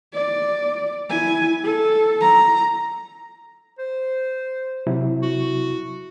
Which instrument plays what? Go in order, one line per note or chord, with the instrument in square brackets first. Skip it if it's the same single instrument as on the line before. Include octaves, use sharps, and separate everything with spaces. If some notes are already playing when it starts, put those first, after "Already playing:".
[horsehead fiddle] D5
E4 G#5
A4
A#5
[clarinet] C5
[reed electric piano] C3 F#3 E4
[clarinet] F#4